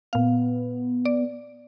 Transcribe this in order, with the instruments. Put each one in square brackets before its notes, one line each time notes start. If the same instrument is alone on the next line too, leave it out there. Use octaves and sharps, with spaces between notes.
[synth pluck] A#2 F5 [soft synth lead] B3
[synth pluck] D5